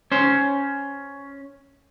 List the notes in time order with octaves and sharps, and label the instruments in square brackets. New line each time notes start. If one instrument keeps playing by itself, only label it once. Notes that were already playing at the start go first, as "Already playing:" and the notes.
[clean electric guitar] C#4 C5